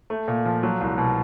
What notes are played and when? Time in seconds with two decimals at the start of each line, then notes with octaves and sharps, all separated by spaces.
0.10 A3
0.28 A#2
0.45 F3
0.63 F#3
0.81 C2
0.98 B2